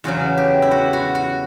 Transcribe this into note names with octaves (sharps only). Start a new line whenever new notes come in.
E2 C#3 F#3 F#4
G4
E4
F#4
F#4
F#4